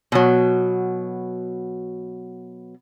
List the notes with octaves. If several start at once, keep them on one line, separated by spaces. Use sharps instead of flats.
B2 F#3